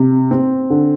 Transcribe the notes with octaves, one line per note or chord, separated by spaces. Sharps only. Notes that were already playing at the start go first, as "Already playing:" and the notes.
Already playing: C3
C4
D3